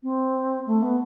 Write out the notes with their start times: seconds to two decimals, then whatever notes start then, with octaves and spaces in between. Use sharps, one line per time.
0.03 C4
0.66 A3
0.82 B3